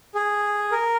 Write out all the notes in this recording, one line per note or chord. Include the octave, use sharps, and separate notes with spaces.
G#4
A#4